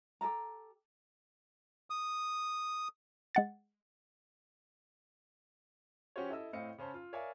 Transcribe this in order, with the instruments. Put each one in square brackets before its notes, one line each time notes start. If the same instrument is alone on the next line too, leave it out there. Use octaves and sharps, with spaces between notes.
[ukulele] G4 A4 A5 A#5
[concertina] D#6
[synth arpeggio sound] G#3 F#5 A6
[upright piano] F3 C#4 F#4 G4 C5 C#5
E4 A4 D#5 E6
A2 C4 D#5 F5 C#7
C#3 C#4 C5 A5
F4
A#4 C#5 D5 E5 F5 G#5